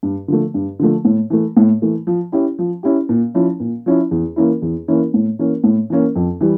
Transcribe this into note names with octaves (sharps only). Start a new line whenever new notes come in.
G2
D3 F3 A3
G2
D3 F3 A3
A2
E3 A3
A2
E3 A3
F3
C#4 E4 G4
F3
C#4 E4 G4
A#2
F3 C#4 E4
A#2
F3 C#4 E4
E2
E3 A#3 C#4 E4
E2
E3 A#3 C#4 E4
A2
E3 A#3 C#4
A2
E3 A#3 C#4
F2
E3 G3